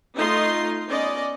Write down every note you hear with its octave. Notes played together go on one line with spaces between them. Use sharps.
A3 D#4 F4 D#5 C6
B3 C#4 D5 D#5